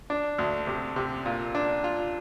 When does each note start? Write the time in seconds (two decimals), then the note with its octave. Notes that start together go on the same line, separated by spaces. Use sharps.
0.10 D4
0.38 D2
0.67 C3
0.96 C3
1.26 A#2
1.55 D4
1.84 F4